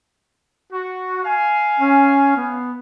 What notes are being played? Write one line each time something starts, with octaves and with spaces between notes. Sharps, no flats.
F#4
F5 G#5
C#4
B3